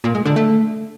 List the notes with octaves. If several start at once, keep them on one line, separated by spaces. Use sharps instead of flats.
A#2
G#3
D3
A3